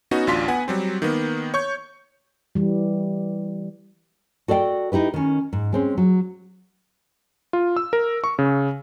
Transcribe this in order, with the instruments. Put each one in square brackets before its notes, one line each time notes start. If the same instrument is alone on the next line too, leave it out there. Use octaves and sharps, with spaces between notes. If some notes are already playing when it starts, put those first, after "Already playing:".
[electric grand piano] B3 C#4 D#4 F#4
A1 D2 D4 F4 C6 B6
B3 F#5 G#5
F#3 G3 C4
D#3 A#3 B3
C#5 C#6 G6
[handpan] E3 G3
[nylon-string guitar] F#4 A4 D5 F5 G5
D#4 E4 G4 B4
D#3 C#4
G#2
G#3 C4 C#4
F#3
[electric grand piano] F4
E6
A#4
C#6
C#3